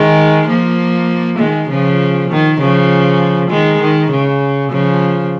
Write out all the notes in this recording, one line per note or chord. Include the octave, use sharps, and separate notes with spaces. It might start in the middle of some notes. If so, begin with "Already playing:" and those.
Already playing: D#3 G#3
F3 A#3
D#3 G#3
C#3 F3
D#3
C#3 F3
D#3 G#3
D#3
C#3
C#3 F3